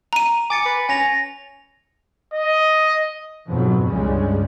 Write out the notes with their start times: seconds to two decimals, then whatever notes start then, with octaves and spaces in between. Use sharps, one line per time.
0.13 A#5 D#7
0.50 G#5 D6 A6 C#7
0.66 B4
0.89 C#4 G#5 A#6 F7
2.34 D#5
3.48 F2 G#2 B2 F3 F#3 B3
3.88 C#2 G2 C#3 G3 G#3